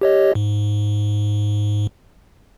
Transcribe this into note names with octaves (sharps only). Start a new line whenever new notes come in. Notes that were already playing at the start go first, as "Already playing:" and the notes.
G4 C#5 D#5
G#2